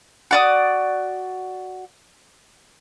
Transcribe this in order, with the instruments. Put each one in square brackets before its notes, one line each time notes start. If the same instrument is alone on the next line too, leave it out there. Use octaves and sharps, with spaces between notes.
[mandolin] F#4 D5 D#6